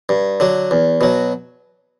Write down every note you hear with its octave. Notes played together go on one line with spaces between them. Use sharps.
G2
D3 F#3
E2
B2 F#3